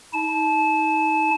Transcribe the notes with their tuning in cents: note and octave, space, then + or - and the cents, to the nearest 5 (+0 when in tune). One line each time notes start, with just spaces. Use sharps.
D#4 +40 A5 -25